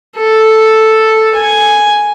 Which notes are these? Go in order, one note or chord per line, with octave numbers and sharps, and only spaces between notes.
A4
G#5